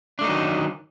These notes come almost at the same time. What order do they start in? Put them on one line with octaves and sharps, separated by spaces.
D4 A3 D#4 F#3 D#3